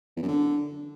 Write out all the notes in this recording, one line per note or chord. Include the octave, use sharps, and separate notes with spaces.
E2
F#2
D3